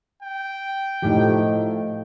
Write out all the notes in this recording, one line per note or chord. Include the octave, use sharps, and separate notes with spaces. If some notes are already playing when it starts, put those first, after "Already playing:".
G5
A2 F3 A3 D#4 G4